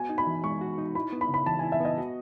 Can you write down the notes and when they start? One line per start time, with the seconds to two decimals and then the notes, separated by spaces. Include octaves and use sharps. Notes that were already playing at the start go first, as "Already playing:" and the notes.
Already playing: B3 F#4 G#5
0.09 D#4
0.18 B5
0.27 E3
0.44 G#3 C#6
0.61 F#4
0.78 D#4
0.95 E4 B5
1.12 B3
1.21 B5
1.29 C#3
1.34 B5
1.46 E3 A5
1.59 G#5
1.63 E4
1.72 E5
1.81 B3 D#5
1.98 F#4